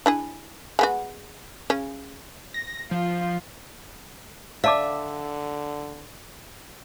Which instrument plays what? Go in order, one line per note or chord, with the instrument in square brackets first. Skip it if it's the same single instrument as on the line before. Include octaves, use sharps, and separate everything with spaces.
[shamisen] D4 E4 G#4
G#3 B3 F#4
C#3 C#4
[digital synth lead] A#6
[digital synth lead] F3 [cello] F4
[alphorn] D3 [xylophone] D5 [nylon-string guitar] E5 [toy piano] F5 A5 D6